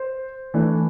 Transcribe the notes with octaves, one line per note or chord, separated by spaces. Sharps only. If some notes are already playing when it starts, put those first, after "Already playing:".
Already playing: C5
E3 A3 D4